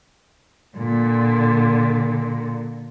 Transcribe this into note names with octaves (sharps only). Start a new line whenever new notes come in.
A#2 D3